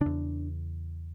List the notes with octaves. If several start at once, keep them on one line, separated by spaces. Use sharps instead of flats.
E2 C#3 D4